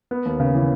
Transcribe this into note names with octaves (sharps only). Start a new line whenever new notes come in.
B3
D#2
C#3
E3